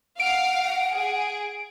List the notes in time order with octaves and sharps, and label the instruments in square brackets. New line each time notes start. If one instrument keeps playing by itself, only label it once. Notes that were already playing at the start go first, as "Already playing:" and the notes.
[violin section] F5 [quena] F#5 [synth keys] D7
[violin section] G#4